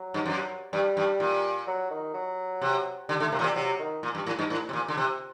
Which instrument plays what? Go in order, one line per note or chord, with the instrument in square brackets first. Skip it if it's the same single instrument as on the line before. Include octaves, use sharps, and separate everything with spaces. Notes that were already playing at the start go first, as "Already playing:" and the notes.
Already playing: [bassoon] F#3
[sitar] G2
F#2
[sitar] G2 [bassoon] G3
[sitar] G2
A#2
[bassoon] F#3
D#3
F#3
[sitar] C3
[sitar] D3 [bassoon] G3
[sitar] D3 [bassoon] A3
[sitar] C3 [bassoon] A#3
[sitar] A#2 [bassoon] F#3
[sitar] C3 [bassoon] G3
[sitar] C3 [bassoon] F#3
[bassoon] D#3
[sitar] A#2
G2
A2
G2
A2
C3
A#2
D3
C3